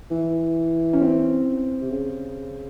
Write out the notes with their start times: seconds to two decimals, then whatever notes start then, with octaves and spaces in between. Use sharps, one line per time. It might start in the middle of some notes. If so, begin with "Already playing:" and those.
0.11 E3
0.93 C#4
1.01 C4
1.81 C3
1.91 C#3